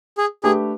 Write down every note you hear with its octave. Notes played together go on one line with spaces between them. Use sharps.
G#4
A3 D4 G4 G#4 B4